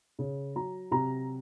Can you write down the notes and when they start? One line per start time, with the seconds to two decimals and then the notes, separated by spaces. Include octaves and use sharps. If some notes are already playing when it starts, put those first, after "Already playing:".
0.19 C#3
0.56 F#3 A#5
0.91 C3 A#5